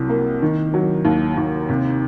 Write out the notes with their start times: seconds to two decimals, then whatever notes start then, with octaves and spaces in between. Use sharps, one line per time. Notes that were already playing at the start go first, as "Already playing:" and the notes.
Already playing: C2 C3 F#3
0.09 A#3
0.42 D#3
0.74 F#3
1.05 D#2
1.37 D#2
1.69 C3